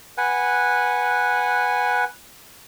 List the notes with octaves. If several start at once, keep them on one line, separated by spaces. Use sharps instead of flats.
B4 F#5 G#5